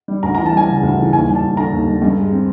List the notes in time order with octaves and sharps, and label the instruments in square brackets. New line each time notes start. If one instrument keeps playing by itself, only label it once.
[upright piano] G3
D2 A#5
A#5
E3
A5
G3 G#5
C#3
D2
E3
D#2 G#5
G3
A5
D#2
D3 A#5
D#2
G3
G2
G#3
C4